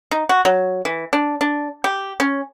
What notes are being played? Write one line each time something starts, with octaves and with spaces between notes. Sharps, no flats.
D#4
F#4
F#3
E3
D4
D4
G4
C#4